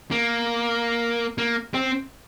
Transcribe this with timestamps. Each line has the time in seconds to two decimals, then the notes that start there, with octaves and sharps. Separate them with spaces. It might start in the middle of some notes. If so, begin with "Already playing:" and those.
0.11 A#3
1.38 A#3
1.74 C4